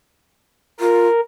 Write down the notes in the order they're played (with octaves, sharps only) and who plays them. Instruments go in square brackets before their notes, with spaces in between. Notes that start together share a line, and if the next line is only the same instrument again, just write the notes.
[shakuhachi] F4 [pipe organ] A#4